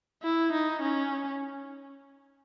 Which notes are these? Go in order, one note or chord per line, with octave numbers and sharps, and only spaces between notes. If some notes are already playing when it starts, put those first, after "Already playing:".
E4
D#4
C#4